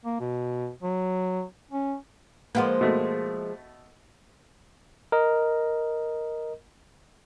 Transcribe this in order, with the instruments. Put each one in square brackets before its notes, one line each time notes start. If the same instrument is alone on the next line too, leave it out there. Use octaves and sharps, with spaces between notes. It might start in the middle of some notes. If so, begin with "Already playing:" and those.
[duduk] A#3
B2
F#3
C#4
[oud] F3 G#3 A#3 [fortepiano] B4 F5 F#5
[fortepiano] B2 A3
[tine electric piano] A#4 D#5